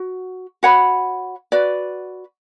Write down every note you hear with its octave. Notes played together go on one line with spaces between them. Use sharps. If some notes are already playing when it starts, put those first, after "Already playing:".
Already playing: F#4
F#4 C#5 F#5 B5
F#4 B4 D5